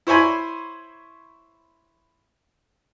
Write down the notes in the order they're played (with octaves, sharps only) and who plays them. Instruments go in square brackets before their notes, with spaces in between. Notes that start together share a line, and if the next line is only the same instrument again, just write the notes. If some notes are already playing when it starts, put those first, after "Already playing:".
[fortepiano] E4 C5 C#5 G#5 B5